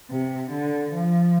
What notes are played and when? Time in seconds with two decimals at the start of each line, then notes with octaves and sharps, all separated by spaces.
0.10 C3
0.51 D3
0.91 F3